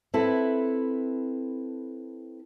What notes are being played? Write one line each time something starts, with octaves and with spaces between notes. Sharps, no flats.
C4 E4 A4 B4